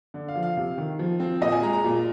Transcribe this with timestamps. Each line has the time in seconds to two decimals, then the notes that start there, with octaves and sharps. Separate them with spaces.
0.14 D3
0.28 F5
0.36 F3
0.43 F5
0.57 C3
0.78 D#3
0.99 F3
1.20 C4
1.41 A#2 D#5
1.52 G#5
1.62 G#3 A#5
1.73 A#5
1.84 A#2